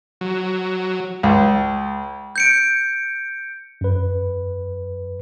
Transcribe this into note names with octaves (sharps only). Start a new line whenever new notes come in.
F#3
C#2
G6 C#7 D7
F#2 B4